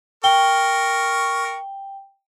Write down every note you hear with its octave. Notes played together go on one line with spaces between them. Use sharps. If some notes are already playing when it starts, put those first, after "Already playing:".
A#4 G5 C#6 G7